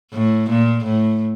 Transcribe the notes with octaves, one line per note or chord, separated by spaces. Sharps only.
A2
A#2
A2